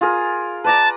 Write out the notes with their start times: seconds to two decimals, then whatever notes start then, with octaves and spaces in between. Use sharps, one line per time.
0.01 F4 G#4 A#4
0.64 B4 D5 A5 A#5